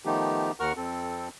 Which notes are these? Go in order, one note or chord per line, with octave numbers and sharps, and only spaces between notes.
D#3 F3 A3 B3 D#4 G4
D#2 A#4 F#5 C#6 F6
F2 C4 A4